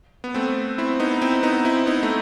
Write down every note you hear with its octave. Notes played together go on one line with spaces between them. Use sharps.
B3
A3 C4
C4 E4
B3 D#4
C4 E4
B3 D#4
C4 E4
B3 D#4
A3